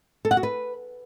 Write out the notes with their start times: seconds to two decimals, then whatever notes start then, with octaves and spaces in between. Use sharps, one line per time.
0.25 A4
0.31 F#5
0.37 F#4
0.43 B4